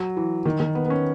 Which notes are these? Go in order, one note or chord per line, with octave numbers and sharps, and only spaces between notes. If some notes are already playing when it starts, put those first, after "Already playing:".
Already playing: F#3
E3
D#3
D#3
B3
B3
C#4